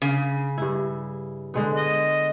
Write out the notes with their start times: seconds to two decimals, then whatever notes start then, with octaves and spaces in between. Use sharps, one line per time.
0.02 C#3
0.58 G2 E4
1.54 D3 G#3 B3
1.77 D#5